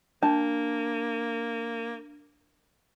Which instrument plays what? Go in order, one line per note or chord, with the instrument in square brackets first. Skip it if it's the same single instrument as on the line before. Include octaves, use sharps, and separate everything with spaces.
[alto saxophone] A#3 [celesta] D4 [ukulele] A5